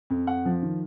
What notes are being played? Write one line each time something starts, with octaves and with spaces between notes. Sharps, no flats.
F2
F2 F#5
F3
D#3